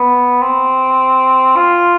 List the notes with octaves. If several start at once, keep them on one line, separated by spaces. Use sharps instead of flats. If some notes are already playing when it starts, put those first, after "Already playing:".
Already playing: B3
C4
F4